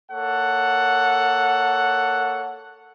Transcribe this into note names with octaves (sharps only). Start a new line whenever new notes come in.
A#3 A4 C#5 F#5